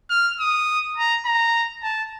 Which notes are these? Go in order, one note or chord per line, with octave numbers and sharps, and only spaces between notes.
F6
D#6
A#5
A#5
A5